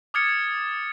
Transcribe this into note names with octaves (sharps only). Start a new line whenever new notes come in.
D6 D#6 F6 G#6 A6 C#7